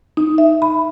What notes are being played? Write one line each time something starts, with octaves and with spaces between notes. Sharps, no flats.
D#4
E5
B5